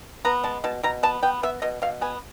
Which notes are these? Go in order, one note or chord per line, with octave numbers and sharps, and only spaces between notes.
B3 A#5
G#3 A5
B2 A5
B2 A#5
B3 A5
B3 G5
B3 E5
B2 D#5
B2 F5
B3 G#5